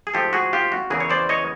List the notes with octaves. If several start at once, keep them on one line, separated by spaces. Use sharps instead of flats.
G#4
G#2 F3 A3 G4 A4
F#4 G#4
F4 G4
F#4
E2 C#3 E3 G#4 A#4
C#5
C5 D5
C#5 D#5